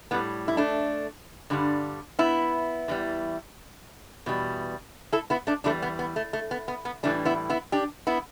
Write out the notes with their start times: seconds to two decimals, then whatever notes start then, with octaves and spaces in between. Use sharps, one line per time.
0.11 A2 G3 B3
0.48 E4
0.57 A3 D4
1.50 G2 D3 G3
2.19 B3 E4
2.88 E2 E3 G3
4.26 E2 B2 G3
5.12 E4 A4
5.30 B3 E4
5.47 A3 D4
5.64 E2 E3 G3 A3 D4
5.82 B3
5.99 B3
6.16 A3
6.33 A3
6.51 B3
6.68 B3
6.85 B3
7.03 A2 E3 G3 A3 D4
7.25 B3 E4
7.50 B3 E4
7.72 D4 G4
8.07 B3 E4